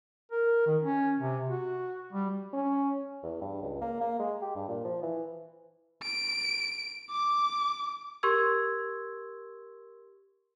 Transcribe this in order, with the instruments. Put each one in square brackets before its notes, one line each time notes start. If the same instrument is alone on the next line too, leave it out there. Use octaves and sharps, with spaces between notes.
[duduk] A#4
D#3
C#4
C3
F#4
G3
[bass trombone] C#4
[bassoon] E2
G2
C#2
A#3
A#3
G#3
G4
G2
A#2
F3
E3
[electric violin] D7
D6
[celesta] G4 A#4 C6 C#6 E6 G#6